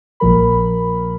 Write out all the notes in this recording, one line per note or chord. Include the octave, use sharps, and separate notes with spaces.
A#1 A#2 F3 A#4 B5